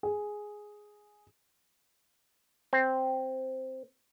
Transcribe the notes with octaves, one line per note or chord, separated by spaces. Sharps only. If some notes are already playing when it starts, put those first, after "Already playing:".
G#4
C4